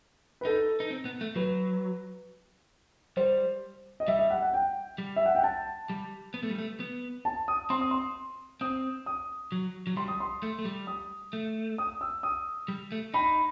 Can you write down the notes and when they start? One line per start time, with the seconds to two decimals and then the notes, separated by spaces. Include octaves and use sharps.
0.41 B4
0.45 D#4 A4
0.80 D#4
0.91 C4
1.05 B3
1.21 A3
1.36 F#3 B4
3.17 G3 C5
4.00 D#5
4.08 G3 E5
4.19 E5
4.30 F#5
4.42 F#5
4.54 G5
4.98 G3
5.16 E5
5.26 F#5
5.35 G5
5.44 A5
5.90 G3
6.34 B3
6.43 A3
6.50 G3
6.58 A3
6.80 B3
7.25 A5
7.48 D#6
7.70 C4 C6
7.81 D#6
7.91 C6
8.61 C4 D#6
9.06 D#6
9.52 F#3
9.87 F#3
9.96 G3 C6
10.08 D#6
10.20 C6
10.43 A3
10.59 A3
10.65 G3
10.87 D#6
11.33 A3
11.78 D#6
12.01 E6
12.23 D#6
12.68 G3
12.92 A3
13.14 D#4 B5